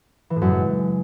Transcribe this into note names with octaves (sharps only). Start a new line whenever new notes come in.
E3
A2
F#2
C#3
G#3